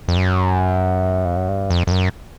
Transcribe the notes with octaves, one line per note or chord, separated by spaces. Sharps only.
F2
F#2
F2
F#2
G2
F2
F2
F#2